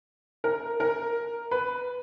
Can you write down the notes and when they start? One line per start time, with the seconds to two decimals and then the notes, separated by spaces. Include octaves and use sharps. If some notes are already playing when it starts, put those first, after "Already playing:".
0.44 A#4
0.80 A#4
1.51 B4